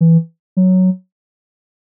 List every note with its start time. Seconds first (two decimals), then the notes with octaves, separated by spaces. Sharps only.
0.01 E3
0.57 F#3